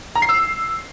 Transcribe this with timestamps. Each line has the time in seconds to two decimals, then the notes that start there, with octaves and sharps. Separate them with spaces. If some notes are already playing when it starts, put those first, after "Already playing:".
0.15 A#5
0.22 C7
0.29 E6